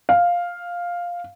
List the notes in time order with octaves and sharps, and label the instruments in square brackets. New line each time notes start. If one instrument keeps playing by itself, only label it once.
[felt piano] F5